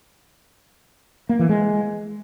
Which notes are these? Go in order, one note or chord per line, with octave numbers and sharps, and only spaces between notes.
A#3
E3
G#3